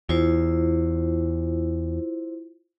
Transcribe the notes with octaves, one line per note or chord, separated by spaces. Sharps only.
E2 E4 F4 C5